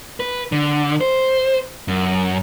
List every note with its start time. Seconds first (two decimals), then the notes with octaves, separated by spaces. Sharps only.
0.20 B4
0.52 D3
1.01 C5
1.88 F#2